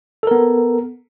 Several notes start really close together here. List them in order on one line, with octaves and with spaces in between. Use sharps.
A4 A#4 B3